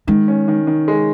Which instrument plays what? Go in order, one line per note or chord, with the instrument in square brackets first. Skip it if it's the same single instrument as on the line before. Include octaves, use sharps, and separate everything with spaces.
[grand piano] D#3 [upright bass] G#3
[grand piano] C#4
D#3
D#3
G#3